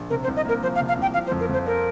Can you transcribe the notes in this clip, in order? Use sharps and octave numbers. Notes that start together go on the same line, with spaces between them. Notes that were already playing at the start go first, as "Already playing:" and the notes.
Already playing: A#1
C3 A#4
C5
C2
D#5
A#3 A#4
F3 C5
F5
C3
F5
C2 G5
F3 F5
C5
F2
A#4
F2 C5
C4 A#4